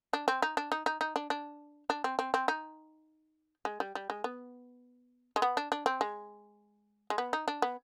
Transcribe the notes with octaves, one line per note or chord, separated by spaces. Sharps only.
D4
C4
D#4
D4
D#4
D#4
D#4
D4
D4
D4
C4
C4
C4
D#4
G#3
G3
G3
G#3
B3
G#3
B3
D4
D4
C4
G#3
G#3
B3
D#4
D4
B3